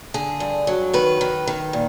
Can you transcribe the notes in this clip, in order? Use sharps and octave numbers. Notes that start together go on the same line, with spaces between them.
D3 G#4
G2
F#3
D#3 B4
D#3
D#3
A#2